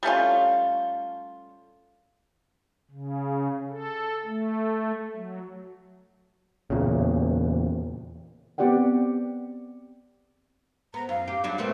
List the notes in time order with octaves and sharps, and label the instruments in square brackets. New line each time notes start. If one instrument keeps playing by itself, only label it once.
[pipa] G3 A3 C#4 F4
[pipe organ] C#3
A4
A3
F#3
[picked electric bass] E2 A#2 C#3
[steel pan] B3 C4 G4 D5 F#5 G5
[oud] B3 [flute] A#5
[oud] F#2 [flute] F5
[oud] G4
F#3 G3 D4
[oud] A3 B3 C4 [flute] A#4